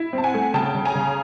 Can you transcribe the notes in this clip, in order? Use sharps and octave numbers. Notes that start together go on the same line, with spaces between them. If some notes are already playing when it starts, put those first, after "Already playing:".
Already playing: E4
C4 A5
F#5 G#5
A3
C#3 G5 A5
C#3
G#5 A#5
C#3